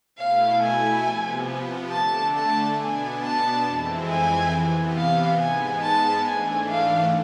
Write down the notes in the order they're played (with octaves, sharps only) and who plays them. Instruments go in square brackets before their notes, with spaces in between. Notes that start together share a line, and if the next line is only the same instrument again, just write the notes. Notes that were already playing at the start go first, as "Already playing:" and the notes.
[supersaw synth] B2 A3 E4 [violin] F5
[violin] G#5
[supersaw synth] C3 F3 B3
[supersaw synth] D3 A3 D4 [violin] A5
[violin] A5
[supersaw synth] B2 B3 D4 [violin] G#5
[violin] A5
[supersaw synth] F2 E3 G#3 C4 E4
[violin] G#5
[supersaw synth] C3 E3 B3
[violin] F5
[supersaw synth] G#2 G#3 B3 [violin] G#5
[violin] A5
[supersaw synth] G#2 E3 A3 D4 [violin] G#5
[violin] F5